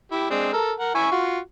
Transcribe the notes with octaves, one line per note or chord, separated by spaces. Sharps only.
E4 G4
G#3 C4 D4
A4 A#4
A#4 F#5
E4 G#5 C#6
F4 F#4